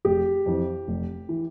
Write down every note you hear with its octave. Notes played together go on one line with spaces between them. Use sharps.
F1 G4
F2 E3
F1
E3